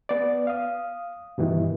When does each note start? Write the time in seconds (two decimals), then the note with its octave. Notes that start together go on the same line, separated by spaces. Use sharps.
0.09 B3 D5
0.47 F5 D#6
1.38 G2 B2 D#3 E3